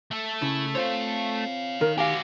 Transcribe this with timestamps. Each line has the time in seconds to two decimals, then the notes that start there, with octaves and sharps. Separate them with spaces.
0.11 A3 A4
0.42 C#3 E4
0.75 C4 F4 C5 C#5 F5
1.81 D#3 A#4
1.98 F#4 G4 D5 F5 G#5